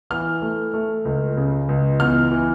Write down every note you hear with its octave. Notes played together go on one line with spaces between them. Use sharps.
E3 F6
A3
A3
C#2
C#3
C#2
E2 F6
E3